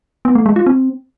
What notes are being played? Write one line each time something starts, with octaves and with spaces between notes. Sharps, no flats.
B3
A3
G#3
F4
C4